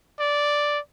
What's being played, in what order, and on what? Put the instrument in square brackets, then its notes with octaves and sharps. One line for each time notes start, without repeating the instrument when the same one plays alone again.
[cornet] D5